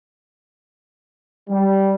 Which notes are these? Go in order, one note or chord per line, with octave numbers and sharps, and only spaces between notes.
G3